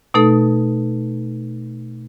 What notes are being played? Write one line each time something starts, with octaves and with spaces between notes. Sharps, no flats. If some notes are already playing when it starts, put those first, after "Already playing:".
B2 A3 D#4 A4